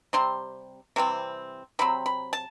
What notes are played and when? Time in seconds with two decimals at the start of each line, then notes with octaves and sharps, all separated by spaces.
0.13 C3 G3 C4 C6
0.96 C3 E3 G3 C4
1.79 C3 F#3 C4 B5
2.06 B5
2.33 A5